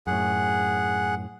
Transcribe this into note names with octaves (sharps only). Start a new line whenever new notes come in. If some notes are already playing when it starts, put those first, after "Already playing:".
F#2 A2 G#4 F#5